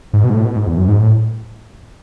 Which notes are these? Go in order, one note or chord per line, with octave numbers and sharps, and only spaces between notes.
G#2
B2
G#2
A2
B2
G#2
E2
F#2
G#2
A2